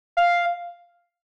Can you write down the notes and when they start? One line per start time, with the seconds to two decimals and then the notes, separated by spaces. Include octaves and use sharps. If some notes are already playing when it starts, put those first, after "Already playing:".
0.17 F5